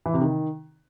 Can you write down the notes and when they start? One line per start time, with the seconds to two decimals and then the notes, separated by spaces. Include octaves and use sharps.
0.06 E3
0.14 C3
0.22 D#3